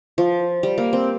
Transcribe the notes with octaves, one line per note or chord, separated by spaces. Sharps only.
F3
G3
A#3
C4